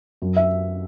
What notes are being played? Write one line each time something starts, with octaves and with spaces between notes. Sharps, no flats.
F#2
E5